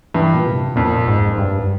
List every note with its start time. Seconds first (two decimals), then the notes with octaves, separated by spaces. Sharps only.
0.14 G2 E3
0.35 A#2
0.46 C3
0.76 F2 A#2
1.08 G#2
1.38 G2